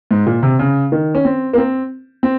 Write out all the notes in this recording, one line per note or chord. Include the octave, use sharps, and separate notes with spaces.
G#2
A#2
C3
C#3
D#3
C#4
C4
A#3
C4
C4